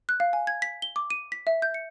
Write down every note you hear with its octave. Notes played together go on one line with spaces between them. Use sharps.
F#6
F5
G#5
G#6
B6
G7
D6
D#7
B6
E5
G6
C#7